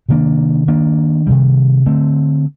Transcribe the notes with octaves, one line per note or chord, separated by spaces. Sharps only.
C3 D#3 A#3 D4
D#3 A#3 D4
C3 D#3 G3
D3 A3 C4